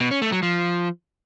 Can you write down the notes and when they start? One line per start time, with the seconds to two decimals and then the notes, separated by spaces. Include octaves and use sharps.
0.01 B2
0.11 C#4
0.22 A3
0.32 F#3
0.43 F3